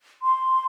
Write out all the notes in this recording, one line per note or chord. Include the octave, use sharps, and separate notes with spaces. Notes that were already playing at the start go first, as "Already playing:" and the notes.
C6